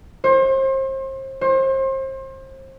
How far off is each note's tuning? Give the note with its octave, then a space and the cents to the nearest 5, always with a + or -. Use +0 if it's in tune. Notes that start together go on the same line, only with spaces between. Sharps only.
C5 +35
C5 +35